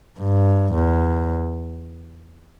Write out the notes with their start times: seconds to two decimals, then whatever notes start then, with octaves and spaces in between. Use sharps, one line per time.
0.20 G2
0.74 E2